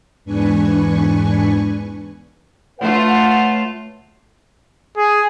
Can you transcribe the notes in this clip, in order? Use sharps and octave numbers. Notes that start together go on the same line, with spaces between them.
E2 G#2 D4 B4 G#5 C#6
A3 F4 B4 C#5 F#5
G#4